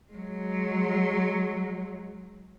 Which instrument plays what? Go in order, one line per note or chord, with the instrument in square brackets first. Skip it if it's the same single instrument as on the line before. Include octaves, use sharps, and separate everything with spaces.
[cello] F#3 G#3